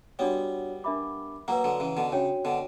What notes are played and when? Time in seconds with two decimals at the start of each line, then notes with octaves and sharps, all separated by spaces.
0.19 G3 B3 D4 F#4 C#5
0.84 D4 A#4 E5 B5 D6
1.48 F#3 A#3 B4 F#5 A#5
1.64 D3 F#3
1.80 C#3 E3
1.97 B2 D3
2.12 C#3 D4 F#4 C#5 G5
2.45 B2 D3